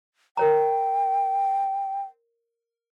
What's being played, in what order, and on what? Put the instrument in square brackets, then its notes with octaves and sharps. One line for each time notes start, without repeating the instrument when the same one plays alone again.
[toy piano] A#4 C#5 A#5 [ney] G5